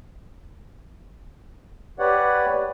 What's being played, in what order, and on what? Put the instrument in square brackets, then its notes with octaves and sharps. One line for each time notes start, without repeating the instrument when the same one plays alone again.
[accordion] G4 B4 C#5 D5 F#5